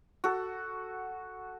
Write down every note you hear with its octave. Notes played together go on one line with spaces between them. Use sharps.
F#4 A4